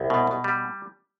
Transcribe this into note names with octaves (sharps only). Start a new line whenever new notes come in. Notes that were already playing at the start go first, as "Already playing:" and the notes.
Already playing: C2
B2
B2
G3